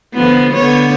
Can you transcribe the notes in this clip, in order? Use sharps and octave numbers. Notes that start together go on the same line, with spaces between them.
D3 F3 B3
D3 B3 C#5